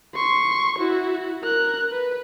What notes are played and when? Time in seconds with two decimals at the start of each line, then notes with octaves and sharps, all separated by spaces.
0.15 C6 C#6
0.78 E4 F#4
1.43 A#4 F#6
1.91 B4